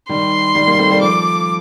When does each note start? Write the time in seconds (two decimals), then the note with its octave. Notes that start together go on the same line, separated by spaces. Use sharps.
0.09 D#3 G3 C6
0.55 D#3 G3
0.67 G3 A#3
0.79 A3 C4
0.90 G3 A#3
1.01 F3 A3 D6